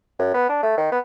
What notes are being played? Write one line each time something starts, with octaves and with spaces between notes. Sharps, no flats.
F#2
B3
D4
A3
D#3
B3